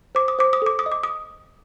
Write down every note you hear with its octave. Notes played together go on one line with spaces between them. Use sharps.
C5 D6
D#6
C5 D6
D#6
A4 D6
D#6
D#5
D6
D#6